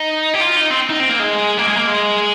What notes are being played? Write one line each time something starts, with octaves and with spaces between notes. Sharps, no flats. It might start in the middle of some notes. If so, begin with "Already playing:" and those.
Already playing: D#4
G4
F4
D#4
C4
D#4
C4
A#3
G#3
A#3
G#3
A#3
G#3